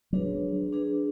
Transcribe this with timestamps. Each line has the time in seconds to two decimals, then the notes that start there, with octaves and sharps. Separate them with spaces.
0.13 F#3 D4 G#4 B4
0.72 D4 G#4 B4